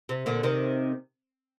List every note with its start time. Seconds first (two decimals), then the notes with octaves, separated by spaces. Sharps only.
0.09 C3
0.26 A#2 D3
0.43 C3 D#3